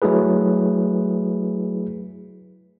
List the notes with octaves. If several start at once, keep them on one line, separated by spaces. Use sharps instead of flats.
F#3 A3 E4 G#4 B4